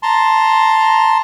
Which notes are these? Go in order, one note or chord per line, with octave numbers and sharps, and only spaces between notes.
A5 A#5 C6